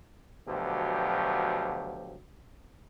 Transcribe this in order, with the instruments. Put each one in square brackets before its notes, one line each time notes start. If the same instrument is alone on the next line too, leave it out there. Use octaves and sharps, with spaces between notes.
[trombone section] D2 B2 F3 F#3 G4